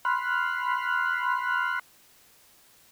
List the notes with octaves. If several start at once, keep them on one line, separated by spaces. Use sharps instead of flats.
B5 C6 F6 F#6